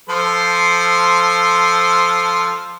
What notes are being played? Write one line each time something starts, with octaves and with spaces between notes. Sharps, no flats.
F3 A4 C5